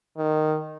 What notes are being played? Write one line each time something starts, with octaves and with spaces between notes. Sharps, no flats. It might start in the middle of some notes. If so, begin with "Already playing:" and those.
D#3